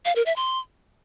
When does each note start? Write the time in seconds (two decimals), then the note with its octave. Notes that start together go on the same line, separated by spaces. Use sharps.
0.05 F5
0.16 A#4
0.26 E5
0.36 C6